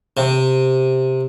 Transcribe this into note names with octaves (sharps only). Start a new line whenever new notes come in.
C3